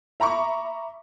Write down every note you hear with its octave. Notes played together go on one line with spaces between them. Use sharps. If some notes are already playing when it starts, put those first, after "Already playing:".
E5 A#5 B5 C#6 D6